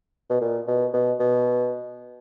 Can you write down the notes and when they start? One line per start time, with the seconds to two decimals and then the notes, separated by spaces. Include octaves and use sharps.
0.30 B2
0.41 A#2
0.68 B2
0.94 B2
1.20 B2